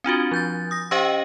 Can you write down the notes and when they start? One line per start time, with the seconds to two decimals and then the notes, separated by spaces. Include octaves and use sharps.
0.04 C4 D4 F4 F#4
0.31 F3 G6 A6
0.71 D#6 A#6
0.91 C#4 G4 C5 D#5 F5 G5